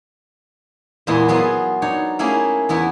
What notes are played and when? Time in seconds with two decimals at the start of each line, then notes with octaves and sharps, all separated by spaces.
1.07 E2 A#2 G#3 B3 E4 C6
1.28 F#3 B3 F4 G#4
1.82 D4 D#4 C#5
2.19 A3 A#3 C#4 E4 G#4 A#4
2.69 E2 B3 E4 G#5